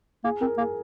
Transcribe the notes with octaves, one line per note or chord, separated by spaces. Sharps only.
A#3 G#4
C4 A#4
A#3 G#4